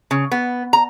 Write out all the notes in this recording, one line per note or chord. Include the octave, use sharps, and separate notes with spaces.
C#3
B3
A#5